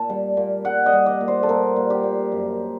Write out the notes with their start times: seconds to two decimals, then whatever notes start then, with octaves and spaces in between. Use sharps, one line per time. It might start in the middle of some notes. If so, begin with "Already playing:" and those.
Already playing: A#2 A5
0.10 G3
0.37 A#2
0.65 G3 F#5
0.86 D#5
0.93 G3
1.06 D5
1.21 A#2
1.28 C5
1.43 A4
1.49 A#2 A#4
1.76 A#2
1.90 G4
2.03 A#2
2.32 F#2